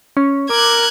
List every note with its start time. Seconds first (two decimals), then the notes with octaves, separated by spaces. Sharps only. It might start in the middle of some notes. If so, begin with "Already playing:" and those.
0.17 C#4
0.50 A#4 D6 F#6 G#6